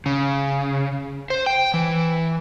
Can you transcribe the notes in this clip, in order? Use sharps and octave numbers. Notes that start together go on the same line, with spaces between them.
C#3
C5
G5
E3